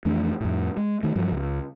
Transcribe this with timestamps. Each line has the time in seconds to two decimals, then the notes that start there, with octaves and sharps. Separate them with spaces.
0.05 F2 E3 A3 D4
0.41 F2 A2
0.77 G#3
1.03 D#3 A3
1.16 G2 F3 F#3
1.32 C#2